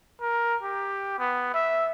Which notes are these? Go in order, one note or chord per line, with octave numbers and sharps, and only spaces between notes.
A#4
G4
B3
E5